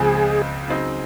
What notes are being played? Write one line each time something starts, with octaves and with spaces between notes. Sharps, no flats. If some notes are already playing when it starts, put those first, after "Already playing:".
Already playing: C#2 C#3 F3 C4 G#4
C#3 F#3 C4 D#4